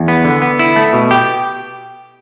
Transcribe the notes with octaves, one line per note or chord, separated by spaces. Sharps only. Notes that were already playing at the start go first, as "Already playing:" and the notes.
Already playing: E2
B3
D3
B3
E4
A3
B2
G4